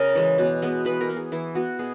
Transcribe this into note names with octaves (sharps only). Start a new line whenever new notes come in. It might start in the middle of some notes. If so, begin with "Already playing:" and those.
Already playing: C#3 G#4 A#4
E3 G#3
B2
G#3 B3
E3 B4
A#4
B3
G#4
E3 E4
B3 F#4
B2 G#4